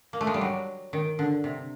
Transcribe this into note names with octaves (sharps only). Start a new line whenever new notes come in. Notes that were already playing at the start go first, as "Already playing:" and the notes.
A#3
A3
G#3
G3
F#3
D#3
D3
C3